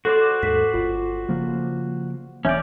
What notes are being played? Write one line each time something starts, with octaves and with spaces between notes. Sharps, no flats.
F#4 A4 C5 D5
D#2 G#2 A4 B6
G1 F4
C#3 F3 A#3
E1 E2 E3 C#4 D5 E5 G6 D7